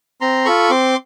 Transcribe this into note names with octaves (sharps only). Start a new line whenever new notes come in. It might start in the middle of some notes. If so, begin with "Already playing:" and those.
C4 A#5 C6
F4 A4 B5 C#6
C4 C6 D6